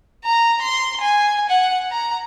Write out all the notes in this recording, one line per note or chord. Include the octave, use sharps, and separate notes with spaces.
A#5
C6
G#5
F#5
A#5